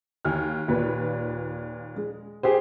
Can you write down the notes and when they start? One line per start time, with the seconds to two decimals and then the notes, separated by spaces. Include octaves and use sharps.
0.25 D#2 G#5 F6
0.68 D#2 A#2 B4
1.96 G#3
2.43 G4 G#4 C5